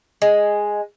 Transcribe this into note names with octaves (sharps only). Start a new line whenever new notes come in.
G#3